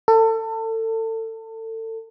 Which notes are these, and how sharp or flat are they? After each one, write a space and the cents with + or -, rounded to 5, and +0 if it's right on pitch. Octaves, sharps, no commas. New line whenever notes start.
A4 +30